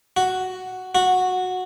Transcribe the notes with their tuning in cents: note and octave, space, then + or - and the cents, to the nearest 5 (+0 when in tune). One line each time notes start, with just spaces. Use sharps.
F#4 +5
F#4 -10